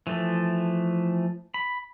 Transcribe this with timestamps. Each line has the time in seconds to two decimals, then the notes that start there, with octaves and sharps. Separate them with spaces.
0.07 E3 F3 A3
1.54 B5